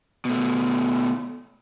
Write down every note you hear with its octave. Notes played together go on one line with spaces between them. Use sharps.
B2 A3